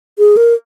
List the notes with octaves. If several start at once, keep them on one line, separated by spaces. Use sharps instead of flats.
G#4
A#4